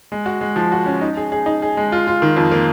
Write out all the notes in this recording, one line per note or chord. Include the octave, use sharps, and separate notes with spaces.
G#3
F#4
G#3
F3
F#4
C#4
D#4
G#4
G#4
D#4
G#4
G#3
F4
F4
D#3
F2
A#3